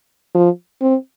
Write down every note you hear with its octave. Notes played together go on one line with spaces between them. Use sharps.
F3
C4